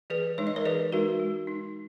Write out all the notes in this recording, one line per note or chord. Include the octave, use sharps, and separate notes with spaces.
E3 G#4 B4
G#3 D#4 C#5
D#5
A#4 C#5
E3 G#4 B4
G#3 D#4 F#4 A#4
G#3
D#4